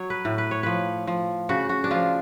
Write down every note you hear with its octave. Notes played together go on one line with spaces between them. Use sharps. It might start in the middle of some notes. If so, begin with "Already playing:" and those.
Already playing: F#3 C#5
B4
A2
B4
C#5
F3 B4
F3
C#3 F#4
F#4
D4
F3 F4